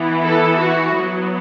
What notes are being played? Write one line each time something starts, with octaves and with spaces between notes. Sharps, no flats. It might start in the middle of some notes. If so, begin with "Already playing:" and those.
Already playing: E3 B3
A4
F#4
F#3 B3